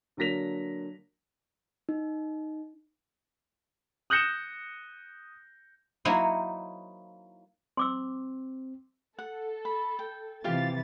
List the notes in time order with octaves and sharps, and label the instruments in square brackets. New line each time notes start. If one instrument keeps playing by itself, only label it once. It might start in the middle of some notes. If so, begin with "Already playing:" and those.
[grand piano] D3 F#3 A#3 A#6 B6 F7
[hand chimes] D#4
[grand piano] D#6 F#6 G6 A#6 C#7 E7
[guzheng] F#3 A#3 D#4 E4 C5 F#5
[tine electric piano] C4 [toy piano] C6 D6 E6
[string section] A4 [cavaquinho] F#5
[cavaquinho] B5
G5
[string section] C3 E3 A6 [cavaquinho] F4 G4 F5